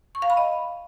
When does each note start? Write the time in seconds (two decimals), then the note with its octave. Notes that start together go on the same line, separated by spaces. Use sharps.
0.15 C#6
0.22 F5
0.30 B5
0.37 D#5